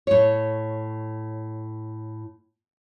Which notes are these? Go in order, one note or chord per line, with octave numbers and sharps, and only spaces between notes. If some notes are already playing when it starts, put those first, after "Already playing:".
A2 C#5